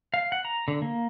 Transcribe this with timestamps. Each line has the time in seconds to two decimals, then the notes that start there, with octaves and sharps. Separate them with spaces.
0.14 F5
0.32 F#5
0.45 A#5
0.68 D3
0.82 A#3